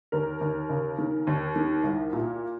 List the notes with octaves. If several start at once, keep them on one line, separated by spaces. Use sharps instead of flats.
D#2 A#4
D#2
C#3
D#3
D#2
D#3
C2
A#2